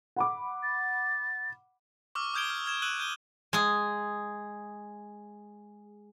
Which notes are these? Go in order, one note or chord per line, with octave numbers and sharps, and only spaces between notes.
F#5 B5 D6
A6
C#6 D6 E6 F6
D#6 F6 G6 G#6 D7 G7
F6
F6 G#6 E7
E6 F#6 D#7 E7 F#7
G6 D#7 G7
G#3 G#4